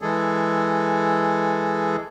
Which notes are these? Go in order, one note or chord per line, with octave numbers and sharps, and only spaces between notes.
E3 G#3 G#4 A4